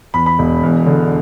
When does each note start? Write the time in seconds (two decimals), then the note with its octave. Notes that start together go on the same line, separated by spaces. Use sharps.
0.14 E2 B5
0.26 B5
0.39 E1
0.63 E2
0.86 D3